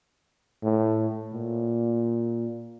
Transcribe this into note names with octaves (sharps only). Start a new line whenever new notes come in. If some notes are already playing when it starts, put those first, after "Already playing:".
A2
A#2